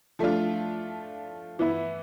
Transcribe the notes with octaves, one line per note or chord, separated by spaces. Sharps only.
F3 A3 D4 F4
E3 B3 E4